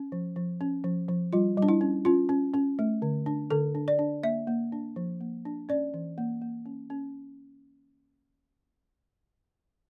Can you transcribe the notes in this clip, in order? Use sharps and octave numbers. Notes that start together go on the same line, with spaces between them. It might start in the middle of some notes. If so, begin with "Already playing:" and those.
Already playing: C#4
F3
F3
C#4
F3
F3
G3 F4
G3
D4
E4
C#4
C#4 F4
C#4
C#4
A3
D3
D4
D3 A4
D4
D5
D4
A#3 E5
A#3
D4
F3
A#3
D4
C#4 D5
E3
A#3
A#3
C#4
C#4